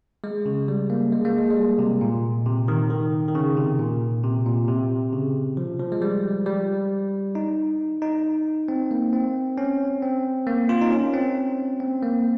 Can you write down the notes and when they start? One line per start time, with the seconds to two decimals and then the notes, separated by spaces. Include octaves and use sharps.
0.24 G#3
0.46 C#3
0.68 G3
0.90 A#3
1.12 G#3
1.25 A#3
1.38 G#3
1.51 G#3
1.57 G3
1.79 C3
2.01 A#2
2.46 C3
2.68 D#3
2.90 D#3
3.28 D#3
3.35 C#3
3.57 C3
3.79 A#2
4.24 C3
4.46 A#2
4.68 C3
5.12 C#3
5.57 F3
5.79 F3
5.92 G#3
6.02 G3
6.46 G3
7.35 D#4
8.02 D#4
8.68 C4
8.91 A#3
9.13 C4
9.58 C#4
10.02 C4
10.47 A#3
10.69 F4
10.81 D#4
10.91 C#4
11.14 C4
11.80 C4
12.02 A#3